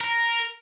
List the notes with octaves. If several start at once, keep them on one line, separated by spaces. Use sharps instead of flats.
A#4